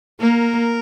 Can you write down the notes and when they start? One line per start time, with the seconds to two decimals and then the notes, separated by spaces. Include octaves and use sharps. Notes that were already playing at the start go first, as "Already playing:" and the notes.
0.20 A#3 A#4